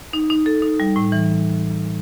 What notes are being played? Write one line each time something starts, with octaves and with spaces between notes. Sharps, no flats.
D#4
D#4
A4
D#4
G3
A2
E3